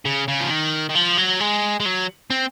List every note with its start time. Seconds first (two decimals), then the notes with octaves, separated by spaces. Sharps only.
0.05 C#3
0.28 C#3
0.40 F3
0.50 D#3
0.89 D#3
0.95 F3
1.18 F#3
1.40 G#3
1.80 G#3
1.86 F#3
2.30 C4